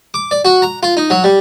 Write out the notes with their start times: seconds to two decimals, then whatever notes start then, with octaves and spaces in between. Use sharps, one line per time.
0.14 D6
0.31 D5
0.45 F#4
0.62 A#5
0.83 F4
0.97 D#4
1.10 F#3
1.24 G3